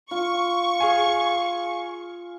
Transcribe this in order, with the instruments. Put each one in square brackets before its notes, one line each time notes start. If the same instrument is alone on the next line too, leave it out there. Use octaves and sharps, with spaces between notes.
[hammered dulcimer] F4 [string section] C#6
[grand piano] G#4 F5 G#5